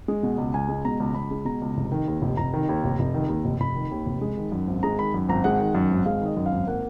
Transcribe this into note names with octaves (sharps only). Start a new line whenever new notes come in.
G#3
B2
C#2
C#2 G#5
G#3
B2 A#5
C#2
C#2 B5
G#3
B2 A#5
C#2
F1
D#3
D#2
F1
F1 A#5
D#3
D#2
F1
F1
D#3
D#2
F1
F1 B5
D#3
D#2
F1
G#3
D#3
F#2
G#1
G#3 A#5
D#3 B5
F#2
G#1 A#5
G#3 F#5
D#3
F#2
G#1
G#3 F5
D#3 D#5
F#2
F5
G#1
A#3 F#5